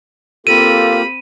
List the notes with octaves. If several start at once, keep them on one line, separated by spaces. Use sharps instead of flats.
A#3 C4 F4 G4 A4 B5 D#7